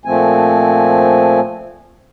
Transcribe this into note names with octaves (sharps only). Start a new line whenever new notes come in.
A#2 F3 A3 C4 G#5